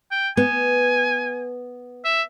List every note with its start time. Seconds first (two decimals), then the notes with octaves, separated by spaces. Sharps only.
0.12 G5
0.37 B3 G#5
2.05 E5